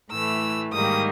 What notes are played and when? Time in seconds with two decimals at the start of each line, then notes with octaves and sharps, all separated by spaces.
0.10 A2 E3 A3 E6
0.73 G#2 D#3 G3 A#3 D#6